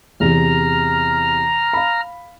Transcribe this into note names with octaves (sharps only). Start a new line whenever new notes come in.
E2 C3 E3 A#5 F6
F5 B5